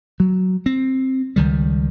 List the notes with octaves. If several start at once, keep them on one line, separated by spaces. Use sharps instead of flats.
F#3
C4
C#2 D#3 G3